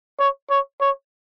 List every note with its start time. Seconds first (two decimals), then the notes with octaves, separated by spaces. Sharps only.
0.19 C#5
0.50 C#5
0.81 C#5